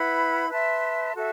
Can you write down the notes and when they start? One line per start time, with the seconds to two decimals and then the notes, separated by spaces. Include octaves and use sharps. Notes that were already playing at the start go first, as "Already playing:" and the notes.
Already playing: E4 B4 F#5 B5
0.50 B4 E5 A5 C6
1.14 F#4 A4 E5